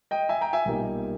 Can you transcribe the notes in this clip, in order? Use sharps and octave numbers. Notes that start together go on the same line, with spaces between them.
D#5 G5
E5 G#5
G5 A#5
E5 G#5
B1 A#2 G3 A#3 D#4